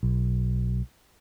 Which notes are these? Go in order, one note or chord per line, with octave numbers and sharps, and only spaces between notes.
B1